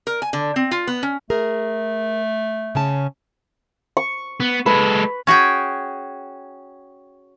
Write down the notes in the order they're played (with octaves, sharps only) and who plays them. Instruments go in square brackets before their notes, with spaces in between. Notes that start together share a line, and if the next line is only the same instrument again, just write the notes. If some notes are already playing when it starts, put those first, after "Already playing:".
[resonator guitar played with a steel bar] A#4
G#5
D3
C4
F4
B3
C#4
[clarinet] A3 [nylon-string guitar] G#4 A#4
[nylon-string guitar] C#3 C#4 A5
[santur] C#6
[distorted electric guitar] B3
[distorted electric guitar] G#3 A4 [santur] B4
[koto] C#4 F#4 G#4 G5